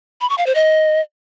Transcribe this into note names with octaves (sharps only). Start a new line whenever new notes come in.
B5
C#6
F5
C5
D#5